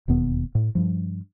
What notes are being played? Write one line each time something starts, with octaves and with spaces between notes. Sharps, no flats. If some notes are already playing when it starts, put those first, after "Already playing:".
E1 D#2 B2 B3
A2
G2 F3